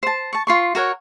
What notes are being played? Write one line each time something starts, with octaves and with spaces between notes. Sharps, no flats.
C5 A5
A5 C#6
F4 C6 C#6
F#4 A#4 C#5 F#5